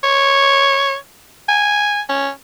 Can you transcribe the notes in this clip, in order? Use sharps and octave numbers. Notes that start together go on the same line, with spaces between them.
C#5
G#5
C#4